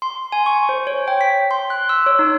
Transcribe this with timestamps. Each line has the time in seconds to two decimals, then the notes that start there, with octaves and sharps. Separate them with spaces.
0.02 C6
0.32 G#5
0.46 C#6
0.69 C5
0.87 C#5
1.08 G5
1.21 B6
1.51 C6
1.70 F#6
1.89 E6
2.06 C#5
2.19 D#4